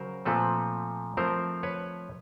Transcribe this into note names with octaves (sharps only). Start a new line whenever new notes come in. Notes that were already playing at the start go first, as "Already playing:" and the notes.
Already playing: C#3 F#3 A#4 C5
A#2 F3 A3 C4 A4 B4
F3 A3 C4 A#4 C5
B4 C#5